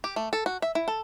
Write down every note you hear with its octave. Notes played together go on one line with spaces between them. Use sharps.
G4
A3
A4
F#4
E5
E4
A4